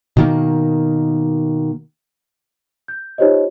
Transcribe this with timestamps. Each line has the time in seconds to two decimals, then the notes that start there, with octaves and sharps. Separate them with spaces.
0.17 B2 D#3 A#3
2.88 G6
3.18 D#4 F4 G4 C5 C#5 D#5